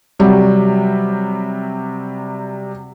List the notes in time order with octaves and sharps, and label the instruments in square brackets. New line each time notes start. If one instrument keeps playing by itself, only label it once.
[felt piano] C3 F#3 G3